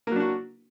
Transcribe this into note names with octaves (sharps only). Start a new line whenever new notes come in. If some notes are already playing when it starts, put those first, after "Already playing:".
F#3 A#3 D4 F#4